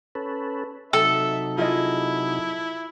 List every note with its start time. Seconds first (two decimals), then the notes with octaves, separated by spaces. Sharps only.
0.15 C#4 A4 B4
0.93 C3 F#3 D#4 A4 E5
1.58 E4 F4 G#4 D#5